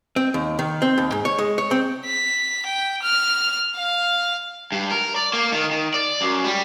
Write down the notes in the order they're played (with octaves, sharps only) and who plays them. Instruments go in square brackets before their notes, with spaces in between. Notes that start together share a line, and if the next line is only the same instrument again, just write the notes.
[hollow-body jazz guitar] C4
D#2
D#3
C4
D#2
G#2
C#5
G#3
C#5
C4
[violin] B6
G5
F6
F5
[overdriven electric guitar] G2
A#4
D5
A#3
D#3
D#3
D5
F#2
G3